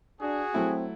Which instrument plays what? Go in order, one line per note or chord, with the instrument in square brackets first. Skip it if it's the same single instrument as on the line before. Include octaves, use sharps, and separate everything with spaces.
[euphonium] D4 [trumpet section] F#4 G#4
[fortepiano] F#3 A3 E4 [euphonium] C4